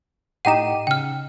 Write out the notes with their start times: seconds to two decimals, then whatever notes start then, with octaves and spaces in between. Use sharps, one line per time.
0.45 A2 D#4 G4 F#5 D#7 E7
0.87 C#3 G5 F6